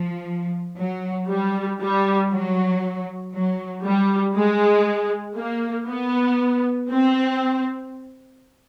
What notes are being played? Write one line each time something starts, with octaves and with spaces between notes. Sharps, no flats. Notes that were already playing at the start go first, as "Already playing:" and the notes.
Already playing: F3
F#3
G3
G3
F#3
F#3
G3
G#3
A#3
B3
C4